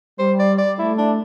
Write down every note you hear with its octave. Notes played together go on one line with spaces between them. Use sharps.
G3 C5
D5
D5
A3 E4
D4